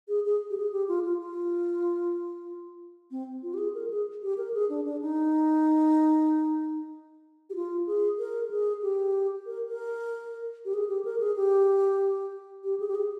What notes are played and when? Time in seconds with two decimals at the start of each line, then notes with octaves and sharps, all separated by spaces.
0.08 G#4
0.25 G#4
0.50 G4
0.57 G#4
0.72 G4
0.88 F4
1.04 F4
1.19 F4
3.11 C4
3.43 F4
3.54 G4
3.58 G#4
3.74 A#4
3.90 G#4
4.22 G4
4.37 A#4
4.54 G#4
4.69 D4
4.85 D4
5.01 D#4
7.50 G4
7.55 F4
7.86 G#4
8.19 A#4
8.51 G#4
8.82 G4
9.46 A#4
9.68 A#4
10.65 G4
10.73 G#4
10.89 G4
11.05 A#4
11.20 G#4
11.36 G4
12.64 G4
12.80 G#4
12.88 G4
12.95 G#4